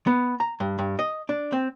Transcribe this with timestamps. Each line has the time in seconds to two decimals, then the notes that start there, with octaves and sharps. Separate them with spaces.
0.07 B3
0.40 A#5
0.60 G2
0.79 G2
0.99 D#5
1.29 D4
1.53 C4